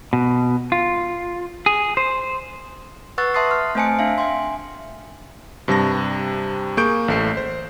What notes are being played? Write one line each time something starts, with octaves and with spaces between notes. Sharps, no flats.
B2
F4
G#4
C5
B4 F#5 C#6 E6 F#6 A6
E5 A5 C6 D#6 A6 C7
C6 F6
A3 C4 C5 G#5 A5 C#7
D4 E5 F5
E5 G5 G#5 C6
G2 C3 G3 A5 A#6
A#3 G#4 C#6 G6 D7
A1 A3 C7
C5